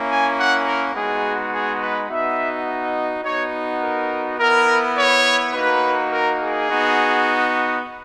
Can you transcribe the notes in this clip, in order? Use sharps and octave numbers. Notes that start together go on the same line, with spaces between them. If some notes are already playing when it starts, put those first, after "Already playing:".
Already playing: A#3 C#4 E4
G#5
F#5
A#4
G#3 B3 D#4 F#4 G#4
G#4
B4
B3 D#4 F#4 E5
D#5
B3 D#4 F#4 C#5
A#4
B3 E4 A#4
C#5
A#3 D#4 F#4 B4
A#4
G#4
B3 D#4 F#4